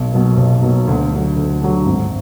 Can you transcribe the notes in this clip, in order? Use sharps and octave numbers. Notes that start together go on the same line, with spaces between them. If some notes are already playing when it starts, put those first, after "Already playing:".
Already playing: B1
B2 F#3 A#3
B1
B2 F#3 A#3
D2
D3 F#3
D2
D3 F#3
G#1